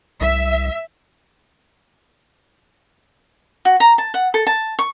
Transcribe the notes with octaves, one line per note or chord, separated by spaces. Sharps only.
C2 E5
F#4
A#5
A5
F#5
A4
A5
C#6